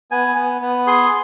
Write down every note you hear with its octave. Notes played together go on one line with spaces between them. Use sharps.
B3 G#5
B3
B3
G#4 C6